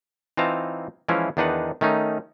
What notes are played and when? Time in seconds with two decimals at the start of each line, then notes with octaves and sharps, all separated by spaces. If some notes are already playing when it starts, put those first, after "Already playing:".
0.37 E3 C4 D#4 F4 A5 A#5
1.09 E3 F3 G#3 C#4 E4 F4
1.37 E2 D#3 D4 D#4 B4 F#5
1.81 D#3 A3 C#4 D#4